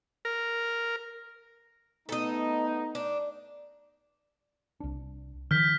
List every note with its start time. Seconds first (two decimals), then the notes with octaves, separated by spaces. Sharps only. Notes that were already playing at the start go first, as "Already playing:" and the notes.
0.25 A#4
2.09 A3 B3 D#4 A4 D#5
2.95 D4
4.80 C2 D4
5.51 D#3 F3 F6 G6 B6